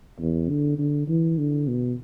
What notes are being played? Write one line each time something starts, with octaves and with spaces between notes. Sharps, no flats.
E2
D3
D3
E3
D3
B2